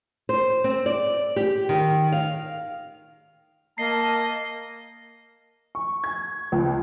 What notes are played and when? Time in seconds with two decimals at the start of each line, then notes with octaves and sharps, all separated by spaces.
0.29 C5
0.64 C4
0.86 D5
1.36 G4
1.69 D#3
2.12 F5
3.78 A#3 D#5 A5 C7
5.75 C#6
6.04 G#6
6.52 C#2